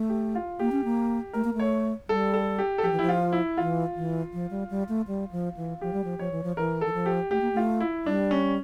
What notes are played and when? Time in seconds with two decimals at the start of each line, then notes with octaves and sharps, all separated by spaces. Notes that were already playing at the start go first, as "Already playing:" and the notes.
Already playing: A3
0.09 G4
0.35 F4
0.59 A#3 G4
0.72 C#4
0.84 A#3
1.33 A3 A#4
1.44 A#3
1.54 A3
1.60 C#5
2.08 G3 A4
2.34 A4
2.58 G4
2.78 A4
2.83 F3 G4
2.92 E3
2.99 F3 E4
3.09 F4
3.32 E4
3.57 E3 F4
3.96 E3
4.33 F3
4.51 G3
4.70 G3
4.89 A3
5.07 G3
5.32 F3
5.57 E3
5.81 F3 G4
5.93 G3
6.04 F3
6.19 F3 C#5
6.32 E3
6.44 F3
6.57 E3 A#4
6.81 E3 A4
6.93 F3
7.06 G4
7.31 A3 G4
7.41 A#3
7.53 A3 F4
7.80 E4
8.06 G3 D4
8.31 C#4